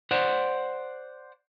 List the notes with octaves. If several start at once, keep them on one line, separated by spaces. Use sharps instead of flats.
C5 D5 F#5